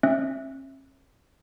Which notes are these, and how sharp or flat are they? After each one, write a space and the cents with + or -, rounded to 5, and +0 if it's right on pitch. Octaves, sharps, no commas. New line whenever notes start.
C#4 -45 E5 +0